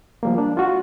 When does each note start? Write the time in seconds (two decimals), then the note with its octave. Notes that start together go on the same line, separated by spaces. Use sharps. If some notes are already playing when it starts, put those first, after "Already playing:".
0.23 F3 G3 A#3
0.38 D4
0.57 F4 F#4